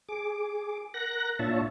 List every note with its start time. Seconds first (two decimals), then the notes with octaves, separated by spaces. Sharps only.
0.09 G#4 D6
0.94 A#4 F#5 F#6 A#6
1.39 A#2 D4 F4 C#5 E5 A5